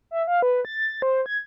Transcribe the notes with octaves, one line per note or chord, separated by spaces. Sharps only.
E5
F5
B4
A6
C5
G#6